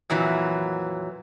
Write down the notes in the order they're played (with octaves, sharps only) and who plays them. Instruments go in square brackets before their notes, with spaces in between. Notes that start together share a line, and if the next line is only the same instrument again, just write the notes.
[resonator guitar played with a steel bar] F2 A#2 E3 F#3